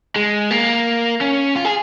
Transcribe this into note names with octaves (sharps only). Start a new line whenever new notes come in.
G#3
A#3
C#4
F4
G#4